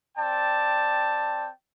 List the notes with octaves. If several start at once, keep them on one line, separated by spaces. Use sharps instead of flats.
C4 D5 G5 A5